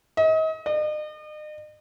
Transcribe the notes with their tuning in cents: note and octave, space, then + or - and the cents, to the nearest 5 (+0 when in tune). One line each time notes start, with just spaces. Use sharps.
D#5 +35
D#5 -40